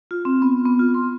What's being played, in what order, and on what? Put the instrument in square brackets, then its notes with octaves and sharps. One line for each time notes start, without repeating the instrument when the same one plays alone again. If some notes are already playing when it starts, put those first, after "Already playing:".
[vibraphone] F4
C4
B3
B3
F4
C6